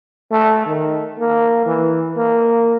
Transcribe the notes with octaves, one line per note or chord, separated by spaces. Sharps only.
A3
D#3
A#3
E3
A#3